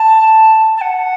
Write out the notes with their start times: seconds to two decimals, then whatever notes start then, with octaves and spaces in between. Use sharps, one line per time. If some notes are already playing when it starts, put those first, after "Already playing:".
Already playing: A5
0.77 A5
0.81 F#5